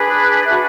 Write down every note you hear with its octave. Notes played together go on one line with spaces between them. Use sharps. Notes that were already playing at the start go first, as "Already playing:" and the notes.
Already playing: D4 G#4 B4
D4 F#4 B4 E5